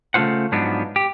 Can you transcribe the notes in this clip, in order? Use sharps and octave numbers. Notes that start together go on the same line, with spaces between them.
C#3 A3 C#4 F4 C5 F#5
G#2 F3 F#3 B3 D4
G4